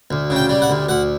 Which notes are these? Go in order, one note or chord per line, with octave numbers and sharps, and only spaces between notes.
D2
C#3
G5
G3
F#5
D2
D2 F#5